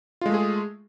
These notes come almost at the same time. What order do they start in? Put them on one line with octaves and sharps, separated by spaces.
F4 G#3 A3 G#4